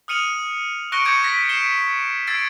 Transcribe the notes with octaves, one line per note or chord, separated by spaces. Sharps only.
D#6 F6 C#7 D#7 F7 F#7
C#6 F#6 A#6 C#7 D7 G7
C#6 D6 G6 G#6 C#7 D#7
A#6 B6
C7 D7 E7 G7
E6 G#6 A6 C7 D7